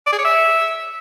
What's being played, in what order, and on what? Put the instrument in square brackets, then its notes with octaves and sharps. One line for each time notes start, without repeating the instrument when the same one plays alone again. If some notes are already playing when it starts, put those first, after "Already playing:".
[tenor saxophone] D5
G#4
C#5
E5